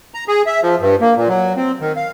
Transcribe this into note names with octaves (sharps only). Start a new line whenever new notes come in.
A#5
G#4
E5
F3
G2
A#3
A#2
F#3
C4
D#3
F5